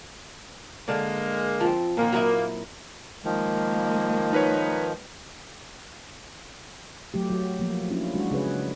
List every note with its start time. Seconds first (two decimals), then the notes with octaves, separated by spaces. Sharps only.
0.88 D3 G#3 A#3 D5
1.60 F3 C4
1.97 A#2 D#3 A#3
2.13 F#3 D#4 E4
3.25 D#3 F3 G#3 A#3
4.33 D#4 B4 C#5
7.14 F#3 A3 G4
7.30 F#3 F#4
7.60 F3 A#3
7.90 A#3 C#4 D4 E4 F4
8.14 G#3 D4 F#4
8.31 C#3 G#4 B4 C#5